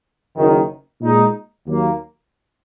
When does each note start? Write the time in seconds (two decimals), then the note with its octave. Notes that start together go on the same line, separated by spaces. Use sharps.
0.37 F#1 F#2 D#3
1.02 A#2 G#3 D#4
1.67 D#2 D#3 F#3 A#3